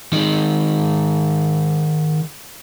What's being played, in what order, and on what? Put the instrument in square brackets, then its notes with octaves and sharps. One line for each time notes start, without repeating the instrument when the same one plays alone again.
[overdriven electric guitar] D#3 G#3